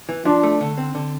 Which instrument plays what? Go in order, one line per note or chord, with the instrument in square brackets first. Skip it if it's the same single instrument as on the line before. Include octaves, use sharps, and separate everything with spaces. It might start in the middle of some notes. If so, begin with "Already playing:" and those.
[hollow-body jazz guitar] E3
[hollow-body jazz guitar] F3 [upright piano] D4
[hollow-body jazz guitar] A3
D3
C4
D3